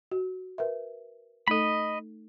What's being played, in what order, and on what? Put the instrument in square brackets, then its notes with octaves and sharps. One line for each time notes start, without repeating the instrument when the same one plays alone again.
[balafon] F#4
A#4 B4 E5
[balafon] A3 D#4 A4 [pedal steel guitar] D#5 B5